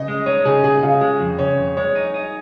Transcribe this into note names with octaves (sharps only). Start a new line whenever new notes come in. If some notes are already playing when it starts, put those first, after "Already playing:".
Already playing: C#3 D#5
G#3
D#4 C#5
C#3 G#4
C#3 G#4
G#4
C#3 F4
G#3 G#4
F2
C#3 C#5
F2
G#3 C#5
D#4
D#4